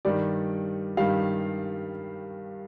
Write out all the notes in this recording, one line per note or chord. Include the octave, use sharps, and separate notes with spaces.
G2 D#3 G3 D5
G2 D#3 G3 F5